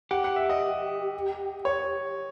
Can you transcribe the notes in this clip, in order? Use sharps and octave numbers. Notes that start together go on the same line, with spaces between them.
G4 F#5
F#5
E5
D#5
C#5